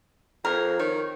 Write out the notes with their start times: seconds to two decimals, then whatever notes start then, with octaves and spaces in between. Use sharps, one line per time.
0.45 F2 A#4
0.79 D#3 C#5